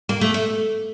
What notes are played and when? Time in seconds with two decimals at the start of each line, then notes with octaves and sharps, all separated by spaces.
0.09 A#3
0.21 A3
0.34 A3